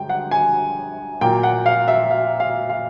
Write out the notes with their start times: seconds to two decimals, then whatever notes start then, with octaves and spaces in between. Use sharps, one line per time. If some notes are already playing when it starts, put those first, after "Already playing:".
Already playing: G2 D3 G#3 G5
0.09 F#5
0.31 G#5
1.21 A#2 F#3 A#3 G5
1.43 F#5
1.66 F5
1.88 E5
2.11 F5
2.40 F5
2.69 F5